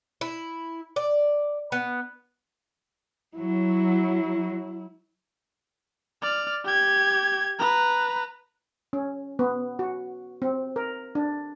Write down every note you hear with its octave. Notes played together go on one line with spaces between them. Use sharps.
E4
D5
B3
F#3 E4
D5 F6
G4 G#6
B4 A#5
C#4
B3
F#4
C4
A#4
D4